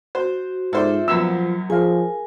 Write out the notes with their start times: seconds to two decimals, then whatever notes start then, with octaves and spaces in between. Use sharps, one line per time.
0.15 F#4 C5
0.73 G#2 F4 A4 C5 D5 E5
1.08 F#2 A#2 F3 F#3 B3 E6
1.70 F3 G#4 A#4 F5 G#5